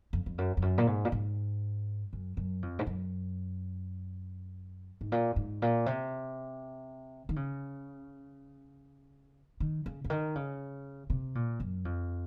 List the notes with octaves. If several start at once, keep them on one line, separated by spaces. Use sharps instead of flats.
F2
F2
F#2
F2
F#2
A#2
G#2
A#2
G#2
F#2
F#2
F2
G#2
F#2
G#2
A#2
G#2
A#2
C3
D#3
C#3
D#3
C#3
C#3
D#3
C#3
C3
A#2
F#2
F2